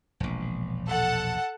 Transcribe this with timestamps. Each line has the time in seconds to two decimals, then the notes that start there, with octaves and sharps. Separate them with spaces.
0.20 E1 A#1
0.88 A4 F#5 A5